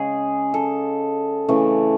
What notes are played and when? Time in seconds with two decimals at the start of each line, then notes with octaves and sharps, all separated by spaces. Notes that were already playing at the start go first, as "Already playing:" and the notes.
Already playing: C#3 G#3 G#4
0.54 A4
1.49 C#3 E3 A3